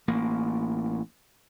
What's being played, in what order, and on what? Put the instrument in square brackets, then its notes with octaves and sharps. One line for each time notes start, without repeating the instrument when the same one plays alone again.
[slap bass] A1 A#3